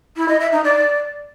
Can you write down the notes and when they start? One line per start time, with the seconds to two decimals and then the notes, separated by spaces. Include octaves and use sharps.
0.17 E4
0.29 D#5
0.40 E5
0.52 D#4
0.64 D5